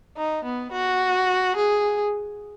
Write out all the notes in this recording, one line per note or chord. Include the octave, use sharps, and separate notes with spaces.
D#4
B3
F#4
G#4